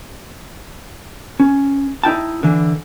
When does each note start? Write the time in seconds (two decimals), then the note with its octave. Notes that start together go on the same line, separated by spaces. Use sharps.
1.40 C#4
2.04 D#4 E4 G5 A5
2.43 D3 E3